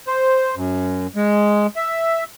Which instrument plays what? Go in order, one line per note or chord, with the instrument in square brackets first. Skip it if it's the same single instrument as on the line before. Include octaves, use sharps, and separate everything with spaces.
[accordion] C5
F#2
G#3
E5